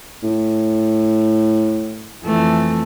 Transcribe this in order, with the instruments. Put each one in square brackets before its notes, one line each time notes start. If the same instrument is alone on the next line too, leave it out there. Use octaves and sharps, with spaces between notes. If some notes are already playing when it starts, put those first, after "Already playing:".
[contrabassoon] A2
[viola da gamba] F2 E3 A3